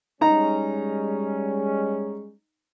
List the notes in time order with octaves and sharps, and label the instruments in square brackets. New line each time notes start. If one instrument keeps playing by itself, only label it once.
[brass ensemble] G3 G#3 C#4 [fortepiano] D#4 A#5